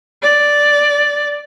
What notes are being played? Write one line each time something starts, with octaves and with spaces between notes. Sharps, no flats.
D5